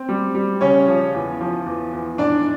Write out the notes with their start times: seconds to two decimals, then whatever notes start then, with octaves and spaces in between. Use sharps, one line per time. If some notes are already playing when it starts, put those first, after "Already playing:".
Already playing: C4
0.09 G3
0.35 G3
0.61 C#3 C#4 C#5
0.88 F3
1.14 E2
1.41 F3
1.66 E2
1.93 E2
2.18 G#2 D4 D5